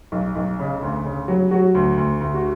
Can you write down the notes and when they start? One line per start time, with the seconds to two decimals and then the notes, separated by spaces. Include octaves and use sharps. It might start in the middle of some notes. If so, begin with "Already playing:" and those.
0.12 B1
0.36 B1
0.59 C#3
0.82 D2
1.05 C#3
1.28 F#3
1.51 F#3 F#4
1.75 D2
1.97 D2
2.21 D2
2.34 F#4